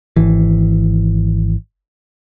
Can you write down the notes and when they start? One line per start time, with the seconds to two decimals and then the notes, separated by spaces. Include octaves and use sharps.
0.16 G#1 E3